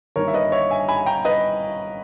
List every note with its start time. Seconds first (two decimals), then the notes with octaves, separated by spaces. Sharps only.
0.16 G1 G2 D#3 A#3 A#4 C#5
0.28 E5
0.34 B4 D#5
0.52 C#5 E5
0.70 E5 G#5
0.89 G#5 B5
1.06 G5 A#5
1.25 B4 D#5